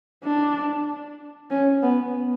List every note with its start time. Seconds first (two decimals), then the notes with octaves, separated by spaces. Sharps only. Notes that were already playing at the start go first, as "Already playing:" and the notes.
0.24 D4
1.50 C#4
1.83 B3